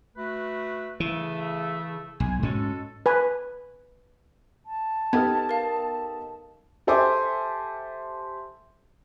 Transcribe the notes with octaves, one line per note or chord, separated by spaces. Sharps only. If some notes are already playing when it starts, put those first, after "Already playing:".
A3 F#4 B4
C#3 E3 A3
B1 G#5
G#2 G#3 C#4 F#4 A4
B4 G#5
A5
B3 D#4 G4 A4 F6 G#6
A#4 F5
G4 A4 C5 E5 G#5 D6